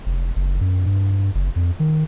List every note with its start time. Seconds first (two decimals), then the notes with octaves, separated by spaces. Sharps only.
0.06 F1
0.36 F#1
0.61 F#2
0.86 G2
1.35 F#1
1.56 F2
1.80 D#3